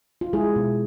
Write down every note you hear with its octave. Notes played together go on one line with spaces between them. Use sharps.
F4
G#3 E4 G#4
B2